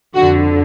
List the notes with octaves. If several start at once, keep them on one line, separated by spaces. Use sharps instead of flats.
F2 D3 F#4